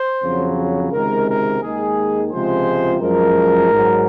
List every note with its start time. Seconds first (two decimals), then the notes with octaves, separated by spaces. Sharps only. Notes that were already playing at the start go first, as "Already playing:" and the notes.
Already playing: C5
0.23 F2 C#3 F#3
0.92 C#2 C3 D#3 G#3 A#4
1.28 A#4
1.62 D#2 D#3 G#3 G#4
2.32 C#2 C3 F3 G#3 C5
3.01 F#2 F3 G#3 A#4
3.71 G#2 F#3